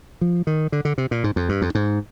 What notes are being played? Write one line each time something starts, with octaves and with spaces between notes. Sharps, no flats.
F3
D#3
D3
D3
C3
A#2
G#2
F2
G2
F2
G#2